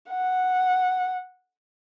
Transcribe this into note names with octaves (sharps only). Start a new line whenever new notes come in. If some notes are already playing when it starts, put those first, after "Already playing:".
F#5